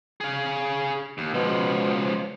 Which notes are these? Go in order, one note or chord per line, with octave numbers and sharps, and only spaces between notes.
G#4 F5
D#2
C#2 B2 F3